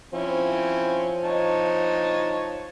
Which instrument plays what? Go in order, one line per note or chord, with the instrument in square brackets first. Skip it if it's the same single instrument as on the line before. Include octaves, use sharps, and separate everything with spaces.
[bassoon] F3 [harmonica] C4 C#4 E4
[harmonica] D#4 C#5 A5